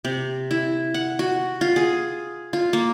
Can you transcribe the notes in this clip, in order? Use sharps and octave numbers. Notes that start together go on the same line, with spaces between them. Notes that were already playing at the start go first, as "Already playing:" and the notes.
C3
E4
F#5
F#4
F4
G#4
F4
A#3